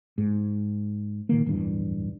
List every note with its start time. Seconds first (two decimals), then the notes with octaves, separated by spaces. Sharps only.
0.18 G#2
1.29 A#2 D#3 A#3
1.46 D1 E2 G2